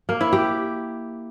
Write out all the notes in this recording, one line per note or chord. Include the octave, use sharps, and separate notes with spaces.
A#3
E4
G4